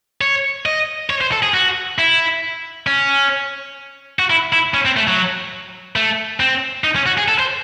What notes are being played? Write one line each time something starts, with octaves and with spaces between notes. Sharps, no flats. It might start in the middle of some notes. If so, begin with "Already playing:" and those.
C#5
D#5
C#5
C5
A4
G#4
F#4
E4
C#4
F#4
E4
E4
C#4
C4
A3
F#3
A3
C4
D#4
C#4
F#4
G#4
A4
C5